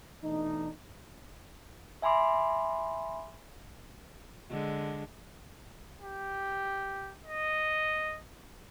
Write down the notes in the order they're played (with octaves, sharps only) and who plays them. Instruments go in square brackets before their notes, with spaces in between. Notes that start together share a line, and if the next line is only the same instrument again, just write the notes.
[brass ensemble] B2 E3 A3 D4 D#4
[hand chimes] E5 G#5 B5 C6 D6
[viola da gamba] D3 G#3
[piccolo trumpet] G4
D#5